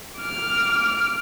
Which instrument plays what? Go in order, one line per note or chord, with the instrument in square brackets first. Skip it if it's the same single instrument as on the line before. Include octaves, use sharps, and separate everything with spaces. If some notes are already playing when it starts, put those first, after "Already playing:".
[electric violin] D6 F6